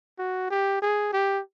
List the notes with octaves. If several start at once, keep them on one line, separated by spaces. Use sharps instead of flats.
F#4
G4
G#4
G4